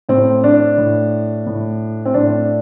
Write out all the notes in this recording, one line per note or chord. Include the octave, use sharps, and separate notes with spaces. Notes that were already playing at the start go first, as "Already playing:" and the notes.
A2 C4
D4
A2
A2
C4
A2 D4